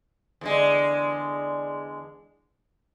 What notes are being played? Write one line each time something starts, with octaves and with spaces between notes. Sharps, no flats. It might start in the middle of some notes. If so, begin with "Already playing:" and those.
E2 D3 G#3